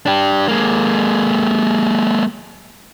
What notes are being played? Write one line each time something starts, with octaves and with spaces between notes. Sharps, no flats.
D4 G4
G#3 A#3